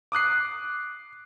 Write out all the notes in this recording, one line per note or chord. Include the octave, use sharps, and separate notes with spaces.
D6 D#6 F#6 C7